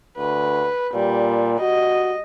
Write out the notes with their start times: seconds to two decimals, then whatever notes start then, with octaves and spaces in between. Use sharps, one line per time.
0.18 D2 B4
0.94 A#2 G3
1.61 F#4 D#5